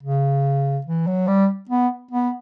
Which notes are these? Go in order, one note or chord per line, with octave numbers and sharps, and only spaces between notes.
C#3
E3
F#3
G3
B3
B3